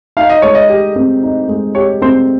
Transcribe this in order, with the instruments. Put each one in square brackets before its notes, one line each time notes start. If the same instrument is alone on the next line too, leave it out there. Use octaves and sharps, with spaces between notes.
[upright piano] D#4 [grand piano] F5
[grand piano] D#5
[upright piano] G#3 [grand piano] C#5
[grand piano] D#5
[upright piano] G4
C4
D#4
G#3
[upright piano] G4 [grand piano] C#5
[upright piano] C4 [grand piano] C5